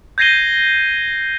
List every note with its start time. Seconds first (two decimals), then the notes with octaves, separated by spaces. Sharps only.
0.18 G6 G#6 A#6 C7 D#7 G7